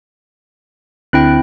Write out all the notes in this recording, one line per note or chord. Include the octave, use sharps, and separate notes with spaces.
D2 D3 C4 E4 G5 F#6